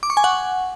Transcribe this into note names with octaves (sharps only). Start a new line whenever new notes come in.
D6
C#6
G#5
F#5